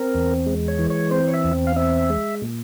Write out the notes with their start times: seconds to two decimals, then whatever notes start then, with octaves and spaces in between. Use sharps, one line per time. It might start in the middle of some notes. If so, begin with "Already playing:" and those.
Already playing: C4 A#4
0.15 E2
0.46 G#3
0.68 C#5
0.79 E3
0.90 C#5
1.11 C4 C5
1.28 C#5
1.34 E5
1.44 E2
1.67 F5
1.76 C4 E5
2.10 G#3
2.42 A#2